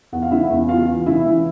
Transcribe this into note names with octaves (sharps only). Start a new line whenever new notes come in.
E2 F#5
F5
C#3 E4 E5
E2
E2 F4 F5
E3
C#3 E4 E5
E3